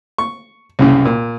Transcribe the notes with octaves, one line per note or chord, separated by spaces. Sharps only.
C#6
C2 F#2 C#3
A#2